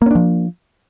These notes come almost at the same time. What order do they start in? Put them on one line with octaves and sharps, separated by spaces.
A#3 C#4 D4 F3